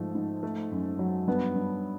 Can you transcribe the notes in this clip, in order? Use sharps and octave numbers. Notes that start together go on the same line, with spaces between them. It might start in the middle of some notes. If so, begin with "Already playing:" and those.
Already playing: G#2 F3 A3
G#2
A3
F#2
F#3
G2 B3
G2